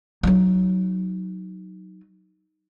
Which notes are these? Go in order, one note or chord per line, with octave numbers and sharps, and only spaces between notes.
F#3 D#4